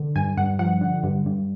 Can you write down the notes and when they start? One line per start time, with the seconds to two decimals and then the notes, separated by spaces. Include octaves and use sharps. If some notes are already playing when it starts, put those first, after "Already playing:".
Already playing: D3
0.16 G2 G#5
0.37 G2 F#5
0.59 F3 F#5
0.81 D3
1.03 G2
1.26 G2